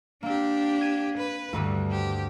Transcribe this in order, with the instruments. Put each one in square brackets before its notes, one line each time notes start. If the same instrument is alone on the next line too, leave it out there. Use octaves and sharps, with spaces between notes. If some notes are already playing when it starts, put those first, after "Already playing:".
[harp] A#3 C4 [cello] D4 G4
[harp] G#6 D#7 E7
[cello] B4
[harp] D2 G2 D3 [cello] G3
[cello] G4 [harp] C5